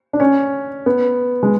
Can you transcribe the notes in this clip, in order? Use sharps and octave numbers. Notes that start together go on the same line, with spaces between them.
D4
C#4
B3
G#3